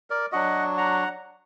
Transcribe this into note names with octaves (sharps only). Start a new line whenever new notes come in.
A#4 D5
F#3 D4 F#4 D#5 F#5
F#5 A#5